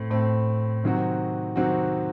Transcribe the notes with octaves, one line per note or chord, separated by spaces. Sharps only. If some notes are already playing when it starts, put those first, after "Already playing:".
Already playing: A2 A3 C4
A2 A3 C4
C3 D#3 F#3 C4 F#4
C3 D#3 F#3 C4 F#4